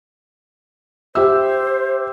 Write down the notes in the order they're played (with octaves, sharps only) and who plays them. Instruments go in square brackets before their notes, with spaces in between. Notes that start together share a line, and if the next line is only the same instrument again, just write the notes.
[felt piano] G4 E5 E6 [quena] C5